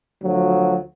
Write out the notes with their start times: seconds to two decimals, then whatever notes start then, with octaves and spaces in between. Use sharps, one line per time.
0.23 D2 F3 F#3